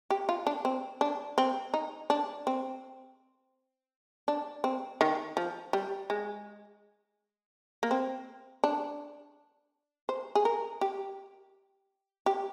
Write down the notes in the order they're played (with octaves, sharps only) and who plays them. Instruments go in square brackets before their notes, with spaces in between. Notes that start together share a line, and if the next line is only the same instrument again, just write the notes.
[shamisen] G4
F4
D4
C4
D4
C4
D#4
D4
C4
D4
C4
D#3
F3
G3
G#3
A#3
C4
D4
C5
G#4
A#4
G4
G4